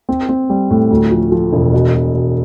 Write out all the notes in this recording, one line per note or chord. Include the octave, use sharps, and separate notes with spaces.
C4
C4
G3
A2
D2
F3
F3
E1
B2
B2
B2